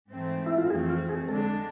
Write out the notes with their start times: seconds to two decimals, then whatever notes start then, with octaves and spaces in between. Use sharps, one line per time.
0.11 G#2 E3 A3 C4
0.46 E4
0.58 F4
0.70 F2 E3 A3 C4 G#4
0.89 F4
1.09 G#4
1.28 D3 G#3 D4 A4